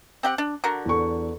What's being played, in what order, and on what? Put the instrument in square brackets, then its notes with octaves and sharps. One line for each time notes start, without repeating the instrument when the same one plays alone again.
[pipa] C4 G4 F#5
D4
D3 F#4 A#4
[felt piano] E2 A4 C#6